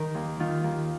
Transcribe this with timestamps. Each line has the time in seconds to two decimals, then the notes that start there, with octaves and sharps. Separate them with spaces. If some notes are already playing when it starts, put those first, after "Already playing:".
Already playing: D#3 A#4
0.15 D#2
0.40 D#3 F4
0.64 D#2